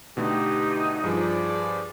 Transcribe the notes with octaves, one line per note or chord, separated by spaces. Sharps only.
B2 D3 A3 D#4 G4
G2 F3 G#4 C5 D5